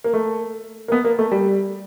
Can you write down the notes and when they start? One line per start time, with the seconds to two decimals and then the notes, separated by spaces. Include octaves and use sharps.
0.04 A#3
0.14 A3
0.88 A#3
0.92 B3
1.05 A#3
1.19 A3
1.32 G3